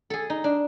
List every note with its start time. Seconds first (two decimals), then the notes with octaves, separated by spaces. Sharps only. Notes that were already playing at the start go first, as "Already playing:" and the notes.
0.10 G#4 A4
0.30 D#4
0.44 D4